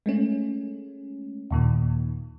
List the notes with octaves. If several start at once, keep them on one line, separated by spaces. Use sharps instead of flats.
G#3 A3 C#4
D#2 A#2 D#3